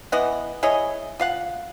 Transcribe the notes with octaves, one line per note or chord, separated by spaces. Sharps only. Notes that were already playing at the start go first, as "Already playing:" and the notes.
E3 B3 D#5 F#5
E4 G#4 C#5 D#5
F4 F5 F#5